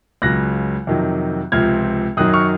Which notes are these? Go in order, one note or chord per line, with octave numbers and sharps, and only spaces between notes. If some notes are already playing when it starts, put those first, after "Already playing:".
C#2 C#3 F#3 F#6 A#6
F2 C3 D#3 F#3
C#2 C3 F3 F6 G#6
F#2 D#3 F#3 D#6 F#6
C#6 F6